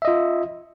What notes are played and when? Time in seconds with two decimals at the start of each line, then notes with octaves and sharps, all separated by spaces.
0.02 E5
0.05 D#5
0.08 F4